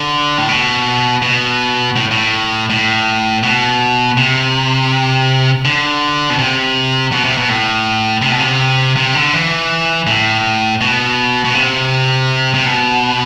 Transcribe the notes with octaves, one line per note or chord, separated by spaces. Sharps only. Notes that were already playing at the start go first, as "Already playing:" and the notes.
Already playing: D3
A2
B2
B2
A2
A2
A2
B2
C3
D3
B2
C3
B2
C3
B2
A2
C3
B2
C3
C3
D3
E3
A2
B2
B2
C3
C3
B2